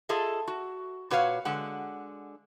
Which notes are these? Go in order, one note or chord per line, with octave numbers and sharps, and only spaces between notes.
F4 G#4 A4 D#5 E5
F#4
A#2 F#4 B4 C#5 F5
D3 G#3 F#5